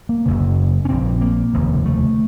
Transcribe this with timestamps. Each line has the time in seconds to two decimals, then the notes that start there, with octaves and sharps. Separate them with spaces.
0.09 A#3
0.26 F#1 F#2 C#3
0.85 C#4
0.89 A#1 A#2 C4
1.21 A#3
1.53 F1 D#2 C#3
1.85 A3